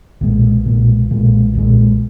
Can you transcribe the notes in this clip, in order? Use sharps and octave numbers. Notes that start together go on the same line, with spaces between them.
B1 A#2 G#3
B1 A#2 G#3
B1 A#2 G#3
B1 A#2 G#3